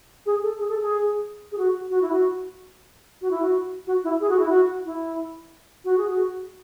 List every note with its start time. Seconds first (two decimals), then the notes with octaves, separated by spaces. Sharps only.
0.26 G#4
0.43 A4
0.59 G#4
0.69 A4
0.81 G#4
1.52 G#4
1.58 F#4
1.90 F#4
2.02 E4
2.12 F#4
3.21 F#4
3.31 E4
3.42 F#4
3.87 F#4
4.04 E4
4.20 G#4
4.29 F#4
4.39 E4
4.49 F#4
4.85 E4
5.85 F#4
5.98 G#4
6.10 F#4